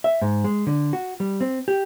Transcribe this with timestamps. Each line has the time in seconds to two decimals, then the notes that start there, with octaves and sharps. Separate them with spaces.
0.04 E5
0.22 G#2
0.44 G#3
0.67 D3
0.93 F#4
1.20 G3
1.41 C4
1.68 G4